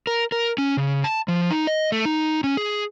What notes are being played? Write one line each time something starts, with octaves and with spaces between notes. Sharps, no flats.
A#4
A#4
C#4
C#3
A5
F3
D#4
D#5
A3
D#4
C#4
G#4